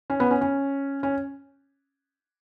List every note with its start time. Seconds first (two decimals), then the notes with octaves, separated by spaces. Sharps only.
0.10 C#4
0.20 B3
0.31 C#4
0.41 C#4
1.03 C#4